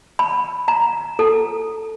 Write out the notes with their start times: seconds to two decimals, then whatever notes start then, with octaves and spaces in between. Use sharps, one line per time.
0.19 B5
0.68 A#5
1.19 A4